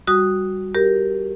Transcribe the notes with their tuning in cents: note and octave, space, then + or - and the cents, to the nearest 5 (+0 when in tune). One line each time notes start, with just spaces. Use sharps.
G3 +0 F#4 +0 D#6 +0
G4 -5 A#4 +0